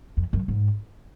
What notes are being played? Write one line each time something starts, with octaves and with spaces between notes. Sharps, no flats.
F2
F#2
G#2